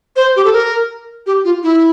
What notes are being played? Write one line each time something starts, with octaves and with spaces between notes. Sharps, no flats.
C5
G4
A4
A#4
G4
F4
E4